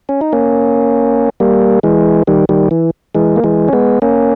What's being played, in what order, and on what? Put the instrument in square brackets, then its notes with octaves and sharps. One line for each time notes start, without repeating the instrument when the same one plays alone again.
[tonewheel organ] C#4
D#4
A#3 C#4
G3 A#3
E3 G#3
D#3 G3
D#3 G3
E3
E3 G#3
A#3
E3 G#3
C#4
G#3 B3
A#3 C#4